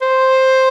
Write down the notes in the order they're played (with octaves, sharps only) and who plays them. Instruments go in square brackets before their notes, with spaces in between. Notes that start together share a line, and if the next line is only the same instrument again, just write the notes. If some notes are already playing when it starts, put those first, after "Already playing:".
[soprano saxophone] C5